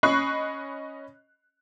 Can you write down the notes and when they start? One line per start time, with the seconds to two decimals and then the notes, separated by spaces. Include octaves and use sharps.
0.03 C#4 D#5 B5 C#6 F#6 C7